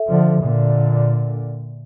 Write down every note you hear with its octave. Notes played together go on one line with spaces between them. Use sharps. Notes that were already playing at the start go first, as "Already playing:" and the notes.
Already playing: A4 E5
D3 F3
A#2 D3